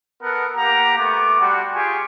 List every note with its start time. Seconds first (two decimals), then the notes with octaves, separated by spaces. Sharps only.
0.22 B3 A4 A#4 F#5
0.55 A#3 G4 F#5 A#5
0.97 A3 B3 D6
1.39 G3 D4 F#4 F#5 C6
1.74 F4 G4 G#4 G#5 C#6